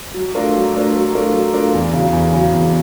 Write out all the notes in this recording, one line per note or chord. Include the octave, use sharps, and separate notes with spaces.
F#3
A3 D4 F4 A#4
F#3
A3 D4 F4 A#4
F#3
A3 D4 F4 A#4
F#3
A3 D4 F4 A#4
E2
C#3 F#3
E2
C#3 F#3
E2